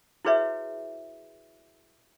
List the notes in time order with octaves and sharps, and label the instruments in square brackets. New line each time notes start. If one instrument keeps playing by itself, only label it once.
[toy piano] E4 F#4 G#4 B4 C#5 E5